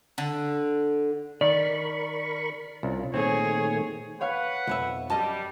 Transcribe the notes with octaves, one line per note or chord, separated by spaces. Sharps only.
D3
D#3 A#4 D5 B5 C#6
C2 C#4 F4
A#2 D#3 A3 C4 G#4 C#5
B4 C#5 F5 F#5 C#6
B1 F2 E5
F#2 G3 D#5 A5